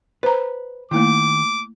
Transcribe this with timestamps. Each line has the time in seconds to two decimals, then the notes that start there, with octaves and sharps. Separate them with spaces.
0.23 B4 C5 A#5
0.91 D#3 A3 A#3 E4 D6